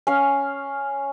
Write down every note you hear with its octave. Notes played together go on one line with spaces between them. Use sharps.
C#4 F5